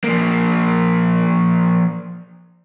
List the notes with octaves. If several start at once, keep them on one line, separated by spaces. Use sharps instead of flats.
F3 A#3